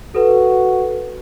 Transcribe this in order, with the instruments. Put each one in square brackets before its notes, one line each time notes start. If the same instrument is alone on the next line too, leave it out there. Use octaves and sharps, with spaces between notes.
[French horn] F#4 [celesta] A4 B4